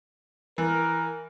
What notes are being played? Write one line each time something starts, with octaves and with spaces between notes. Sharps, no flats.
E3 A#4